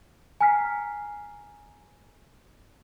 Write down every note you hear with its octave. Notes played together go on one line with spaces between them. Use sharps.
G#5 A#5 F6 B6 C7